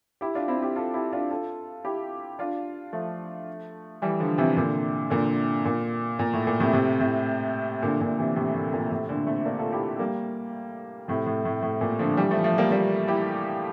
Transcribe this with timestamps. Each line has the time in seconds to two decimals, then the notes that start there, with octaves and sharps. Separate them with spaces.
0.21 E4 G4
0.35 D4 F4
0.48 C4 E4
0.62 E4 G4
0.76 F4 A4
0.94 E4 G4
1.13 D4 F4
1.30 F4 A4
1.84 E4 G4
2.39 D4 F4
2.93 F3 A3
4.02 E3 G3
4.20 D3 F3
4.38 C3 E3
4.57 A#2 D3
5.10 A#2 D3
5.65 A#2
6.19 A#2
6.33 A2
6.47 A#2
6.60 A2 C3
6.73 A2 C3
7.00 A2 C3
7.82 A#2 D3
8.00 A#2 D3
8.19 C3 E3
8.36 A2 C3
8.55 A2
8.74 A#2
8.92 A2 C3
9.09 A#2 D3
9.27 A3 C4
9.45 A#3 D4
9.59 F4 A4
9.72 E4 G4
9.99 G3 A#3
11.08 A2 C3
11.26 A2
11.45 A2
11.63 A2
11.81 A#2
11.99 D3 F3
12.17 E3 G3
12.31 F3 A3
12.44 F3 A3
12.58 G3 A#3
12.71 G3 A#3
13.08 E4 G4